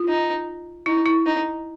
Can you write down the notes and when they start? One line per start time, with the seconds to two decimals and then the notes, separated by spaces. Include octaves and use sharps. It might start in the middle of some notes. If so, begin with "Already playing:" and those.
Already playing: F4
0.08 D#4
0.86 D#4 E4
1.06 E4
1.26 D#4